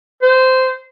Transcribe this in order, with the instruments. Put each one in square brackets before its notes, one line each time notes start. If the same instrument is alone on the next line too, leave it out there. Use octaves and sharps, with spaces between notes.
[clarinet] C5